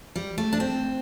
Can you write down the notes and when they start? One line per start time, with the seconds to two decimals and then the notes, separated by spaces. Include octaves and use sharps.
0.16 G3
0.38 A3
0.53 D4
0.60 C4